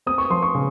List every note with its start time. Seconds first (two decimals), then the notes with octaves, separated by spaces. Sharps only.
0.06 C4 D#6
0.18 C#6
0.30 F3 C6
0.43 C#6
0.55 C#3